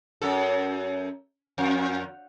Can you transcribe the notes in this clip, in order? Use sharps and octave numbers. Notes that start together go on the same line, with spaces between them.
F#2 A4
F2